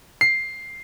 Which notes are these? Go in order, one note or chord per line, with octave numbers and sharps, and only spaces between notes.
C7